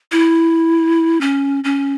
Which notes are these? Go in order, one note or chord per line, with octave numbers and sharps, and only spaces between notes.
E4
C#4
C#4